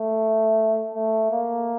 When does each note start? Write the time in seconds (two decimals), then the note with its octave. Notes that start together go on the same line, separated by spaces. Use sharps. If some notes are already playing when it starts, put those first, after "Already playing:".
Already playing: A3
0.95 A3
1.31 A#3